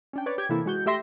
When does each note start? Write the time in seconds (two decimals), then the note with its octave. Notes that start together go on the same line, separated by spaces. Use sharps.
0.13 C#4 D4 G5
0.26 B4 C#5 D5
0.38 G4 G#6
0.49 C3 E3 A#3 E4 A4
0.66 G#3 F#4 G6
0.86 A3 G4 E5 C6 A#6